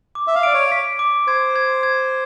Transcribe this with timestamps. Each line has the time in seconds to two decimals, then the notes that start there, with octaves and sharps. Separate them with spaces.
0.15 D6
0.27 E5
0.35 F5
0.43 D5 D7
0.54 C#5
0.72 B6
0.99 D6
1.27 C5 G#6
1.56 G#6
1.83 G#6